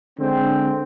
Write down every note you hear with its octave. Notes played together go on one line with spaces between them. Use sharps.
D3 G#3 C4